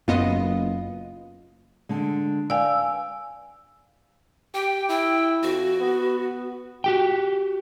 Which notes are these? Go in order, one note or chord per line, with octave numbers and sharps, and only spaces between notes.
F#1 F#2 B3 F4 D#5
D3 G#3
B4 D5 F5 G5 G#5 E6
G4 G5
E4 G5
F2 F#4
B3
F#4 G4 G5